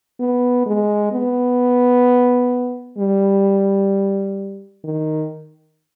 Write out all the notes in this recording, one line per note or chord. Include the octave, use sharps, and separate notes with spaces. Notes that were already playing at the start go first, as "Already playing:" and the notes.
B3
G#3
B3
G3
D#3